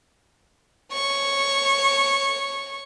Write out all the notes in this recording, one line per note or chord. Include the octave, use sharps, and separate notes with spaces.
C#5 C#6